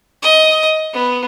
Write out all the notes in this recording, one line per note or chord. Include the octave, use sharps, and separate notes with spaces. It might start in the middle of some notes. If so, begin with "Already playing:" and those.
D#5
B3